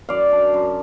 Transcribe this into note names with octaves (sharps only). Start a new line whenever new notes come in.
F#2 D5 F5
D4
F#2